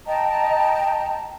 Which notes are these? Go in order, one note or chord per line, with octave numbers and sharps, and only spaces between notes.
D#5 G5 A5 A#5